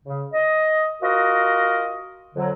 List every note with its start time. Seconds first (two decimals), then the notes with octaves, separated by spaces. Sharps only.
0.05 C#3
0.33 D#5
1.02 F4 F#4 A#4 D#5
2.35 F2 D3 F#3